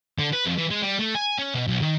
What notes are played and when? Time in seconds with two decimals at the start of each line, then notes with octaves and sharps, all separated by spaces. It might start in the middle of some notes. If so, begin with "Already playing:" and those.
0.19 D3
0.33 B4
0.46 F2
0.58 E3
0.71 G#3
0.82 G3
0.99 A3
1.15 G#5
1.38 C#4
1.54 B2
1.68 B1
1.82 D#3